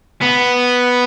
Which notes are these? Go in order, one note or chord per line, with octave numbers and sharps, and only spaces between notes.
B3